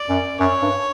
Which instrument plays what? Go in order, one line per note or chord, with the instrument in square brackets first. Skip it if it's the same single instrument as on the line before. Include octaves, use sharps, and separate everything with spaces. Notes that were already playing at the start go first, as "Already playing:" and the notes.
Already playing: [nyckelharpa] D5
[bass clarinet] F#2
[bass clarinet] F#2 [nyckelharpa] C#5
[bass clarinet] G2